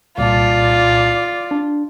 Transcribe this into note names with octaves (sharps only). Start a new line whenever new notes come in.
C2 A#2 F4 D5 A5
D4